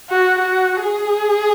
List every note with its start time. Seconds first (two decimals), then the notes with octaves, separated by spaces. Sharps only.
0.10 F#4
0.39 F#4
0.83 G#4